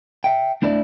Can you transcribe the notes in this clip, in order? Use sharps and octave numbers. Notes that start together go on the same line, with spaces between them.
E5 G5
A3 D4 E4 D5